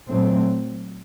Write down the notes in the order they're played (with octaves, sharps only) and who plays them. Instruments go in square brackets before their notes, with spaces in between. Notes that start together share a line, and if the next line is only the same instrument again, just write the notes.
[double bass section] A#2 F#3 A3 C4